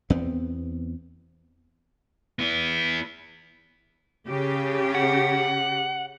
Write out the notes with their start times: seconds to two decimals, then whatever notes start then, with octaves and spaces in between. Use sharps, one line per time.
0.10 E2 B3 C4
2.39 B3 E4
4.27 C#3 G4
4.95 F#5